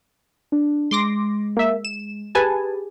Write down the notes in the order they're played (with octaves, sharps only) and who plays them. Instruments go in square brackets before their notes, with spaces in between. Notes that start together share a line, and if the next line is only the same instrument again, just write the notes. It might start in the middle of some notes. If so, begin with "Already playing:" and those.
[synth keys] D4
[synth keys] G#3 [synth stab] C6 D6 A#6
[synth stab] A#3 E5
E7
[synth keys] G4 G#4 [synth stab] B4 G#5 A5